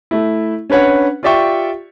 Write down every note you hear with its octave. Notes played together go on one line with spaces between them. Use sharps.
A3 E4
C#4 D4 B4 C#5 F#5
F4 G4 D5 E5 G5 C#6